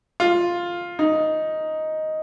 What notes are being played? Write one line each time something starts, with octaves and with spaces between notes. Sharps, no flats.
F4
D#4